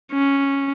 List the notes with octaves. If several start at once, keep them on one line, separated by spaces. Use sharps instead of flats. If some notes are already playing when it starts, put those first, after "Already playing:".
C#4